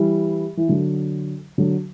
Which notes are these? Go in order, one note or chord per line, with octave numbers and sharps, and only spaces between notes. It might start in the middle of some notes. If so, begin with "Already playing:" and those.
Already playing: E3 G3
E3
D3 F#3
D3 F#3